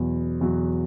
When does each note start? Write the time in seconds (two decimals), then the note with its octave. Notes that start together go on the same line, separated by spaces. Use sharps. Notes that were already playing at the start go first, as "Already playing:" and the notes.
Already playing: E2 B2 F#3
0.41 E2 B2 F#3